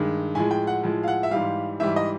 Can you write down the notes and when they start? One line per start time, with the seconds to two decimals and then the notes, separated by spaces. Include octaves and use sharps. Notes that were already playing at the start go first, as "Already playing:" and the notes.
Already playing: G2 D#3 G#3
0.35 A2 F3 G#3 G#5
0.51 G5
0.67 F#5
0.83 A2 F3 G#3
1.03 F5
1.08 F#5
1.23 E5
1.31 G#2 E3 G3 F5
1.80 G#2 E3 G3 E5
1.96 D#5